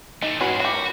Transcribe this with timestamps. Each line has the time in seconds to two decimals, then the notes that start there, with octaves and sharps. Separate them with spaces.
0.22 E3 A3 D#4
0.41 G#2 C#4 F#4 G#4 B4
0.60 F#4 G4 B5
0.74 A#4